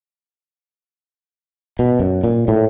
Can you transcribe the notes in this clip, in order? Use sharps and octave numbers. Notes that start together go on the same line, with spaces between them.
B2
F#2
A#2
A2